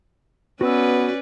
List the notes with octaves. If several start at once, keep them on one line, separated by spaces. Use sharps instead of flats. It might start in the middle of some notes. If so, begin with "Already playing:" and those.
B3 C#4 F#4 B4 D5 E6